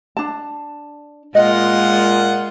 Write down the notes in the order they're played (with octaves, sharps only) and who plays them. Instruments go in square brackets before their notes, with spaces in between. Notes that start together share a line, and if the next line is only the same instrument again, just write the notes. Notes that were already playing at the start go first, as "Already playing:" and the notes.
[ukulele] D4 A5
[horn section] A#2 F#5 [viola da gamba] G#3 F4 [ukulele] D#5